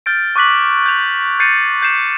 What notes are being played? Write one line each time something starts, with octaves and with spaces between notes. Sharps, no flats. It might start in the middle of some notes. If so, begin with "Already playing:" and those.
F6 G6 A6 D7
C#6 D6 F#6 B6 F#7
G6 F7
G6 A6 C7 C#7 D#7
G6 C7 E7